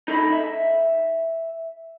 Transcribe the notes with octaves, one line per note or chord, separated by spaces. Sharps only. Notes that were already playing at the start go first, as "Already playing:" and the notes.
D#4 A4 D#5 B5
E5